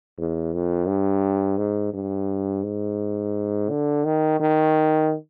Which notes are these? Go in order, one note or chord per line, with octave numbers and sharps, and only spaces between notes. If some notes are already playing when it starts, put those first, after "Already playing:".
E2
F2
G2
G#2
G2
G#2
D3
D#3
D#3